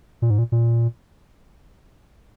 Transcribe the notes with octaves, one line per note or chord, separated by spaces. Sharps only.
A#2
G#2
A#2
A#2